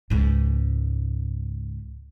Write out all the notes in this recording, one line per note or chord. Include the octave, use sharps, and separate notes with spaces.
C#2 G#2